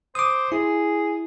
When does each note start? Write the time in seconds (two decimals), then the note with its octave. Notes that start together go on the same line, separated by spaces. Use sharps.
0.15 C5 D6 D#6
0.52 E4 G#4